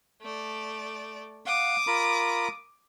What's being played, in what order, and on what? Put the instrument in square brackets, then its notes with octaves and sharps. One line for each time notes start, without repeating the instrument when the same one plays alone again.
[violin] A3 D5
[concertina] F5 F#5 [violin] D6 D#6
[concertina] F4 A#4 B5